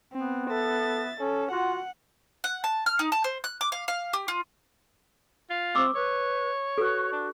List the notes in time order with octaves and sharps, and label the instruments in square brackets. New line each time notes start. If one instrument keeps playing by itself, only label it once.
[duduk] B3 [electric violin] C4
[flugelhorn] A4 [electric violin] E5 A6
[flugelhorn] C#4 [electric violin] A4
[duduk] F4 [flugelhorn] F#4 [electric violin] F#5
[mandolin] F#5
A5
F6
D#4
A5
C5
F#6
D6
F5
F5
G4
F4
[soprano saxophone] F4
[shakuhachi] C4 [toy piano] C#6 D6 E6
[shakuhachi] B4 [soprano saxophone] C#5
[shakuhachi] F#4 [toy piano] A4 B4
[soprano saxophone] D4